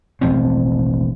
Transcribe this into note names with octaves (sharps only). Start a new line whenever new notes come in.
E1 A1 F3 C4